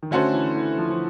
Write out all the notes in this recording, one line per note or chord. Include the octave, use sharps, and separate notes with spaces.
D#3
D3 A3 C#4 F#4 A4 C5
E3
E3
F3
F3